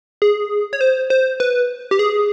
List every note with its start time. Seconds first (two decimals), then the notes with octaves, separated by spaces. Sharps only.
0.22 G#4
0.73 C#5
0.81 C5
1.10 C5
1.40 B4
1.91 G4
1.99 G#4